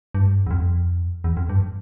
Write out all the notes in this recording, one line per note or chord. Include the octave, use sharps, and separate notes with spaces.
G2
E2
F2
E2
F2
G2